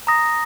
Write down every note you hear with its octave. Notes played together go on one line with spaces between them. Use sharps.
A#5 D#6 A#6